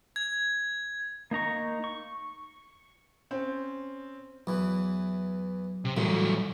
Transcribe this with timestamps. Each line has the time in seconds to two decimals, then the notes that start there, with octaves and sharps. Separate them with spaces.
0.16 G#6
1.31 A#3 D#4 A#5 C#6
1.84 C#6
3.31 C4 C#4
4.47 E2 E3 F#3
5.85 C3
5.97 D2 A2 E3 F#3 G3